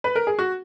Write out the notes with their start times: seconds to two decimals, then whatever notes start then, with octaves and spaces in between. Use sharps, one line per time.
0.04 B4
0.15 A#4
0.27 G#4
0.39 F#4